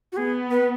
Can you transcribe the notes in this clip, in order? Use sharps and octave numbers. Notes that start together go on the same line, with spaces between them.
F#4
B3 G#4
B4